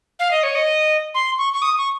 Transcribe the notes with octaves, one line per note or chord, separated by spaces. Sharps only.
F5
D#5
C#5
D#5
C6
C#6
C#6
D#6
C#6